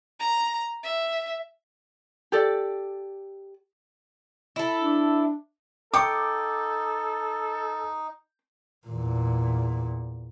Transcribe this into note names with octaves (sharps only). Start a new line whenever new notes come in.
A#5
E5
G4 A4 D5
E4 A4
D4
D#4 A4 G5 C#6 D6
E2 A#2